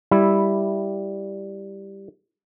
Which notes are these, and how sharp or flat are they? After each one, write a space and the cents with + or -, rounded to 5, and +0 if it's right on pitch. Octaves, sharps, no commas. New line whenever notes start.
G3 +0 E4 +0